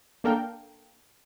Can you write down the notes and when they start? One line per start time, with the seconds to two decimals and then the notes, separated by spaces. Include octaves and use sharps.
0.24 A#3 D4 A4 A#4 F5 G5